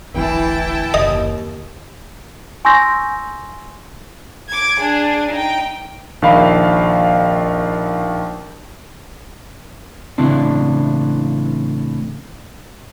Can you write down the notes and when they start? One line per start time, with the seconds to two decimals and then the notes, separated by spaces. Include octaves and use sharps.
0.14 D1 G#1 D2 E3 E4 G5 A5
0.94 F#1 D#2 D#5
2.65 G#5 C6 C#6 E6 G6 A#6
4.49 D6 G#6
4.80 D4 G#4
5.31 D#4 G5
6.22 A#1 D#3 F5 B5
10.18 A2 C#3 E3 C4 D4